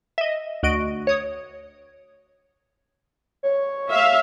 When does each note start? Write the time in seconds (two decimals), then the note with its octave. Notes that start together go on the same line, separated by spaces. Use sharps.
0.18 D#5 E5
0.63 D2 F#4 D#5 D7
1.07 C#5 D#6
3.43 C#5
3.89 E5 F5